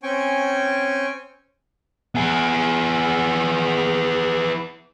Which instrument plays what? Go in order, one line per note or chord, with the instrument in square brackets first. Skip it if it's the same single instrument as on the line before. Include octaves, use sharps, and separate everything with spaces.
[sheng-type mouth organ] C4 C#4 G5 G#5 C#6
[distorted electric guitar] B3 G#4